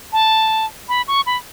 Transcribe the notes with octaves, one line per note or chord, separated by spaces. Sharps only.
A5
B5
C#6
B5